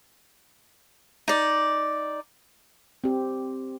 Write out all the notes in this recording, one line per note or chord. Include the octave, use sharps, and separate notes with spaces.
D#4 D5
C4 G4